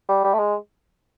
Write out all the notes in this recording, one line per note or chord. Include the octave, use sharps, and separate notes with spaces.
G3
G3
A3
G#3